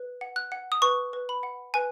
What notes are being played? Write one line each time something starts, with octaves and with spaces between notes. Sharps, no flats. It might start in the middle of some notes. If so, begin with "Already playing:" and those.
Already playing: B4
F#5
F#6
F#5
D#6
B4 C#6
B4
B5
F#5
B4 G#5